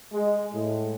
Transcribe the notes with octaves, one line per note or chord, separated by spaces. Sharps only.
G#3
A2